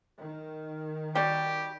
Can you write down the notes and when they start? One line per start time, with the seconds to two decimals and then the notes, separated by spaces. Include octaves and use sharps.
0.17 D#3
1.15 G3 F#4 G4 D5